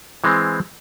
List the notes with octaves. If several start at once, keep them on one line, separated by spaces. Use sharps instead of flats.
E3 G#3 C4